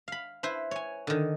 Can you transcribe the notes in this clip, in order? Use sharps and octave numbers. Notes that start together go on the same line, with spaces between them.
F5 B5
E4 B4 C5
C#5 G#5
D3 D#3